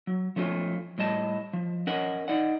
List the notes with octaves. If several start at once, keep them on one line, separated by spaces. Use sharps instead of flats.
F#3
F3 A3 C#4 D#4 F4
A2 G3 D#5 A5
F3
C#4 A#4 D#5 F#5
D#4 D5 F#5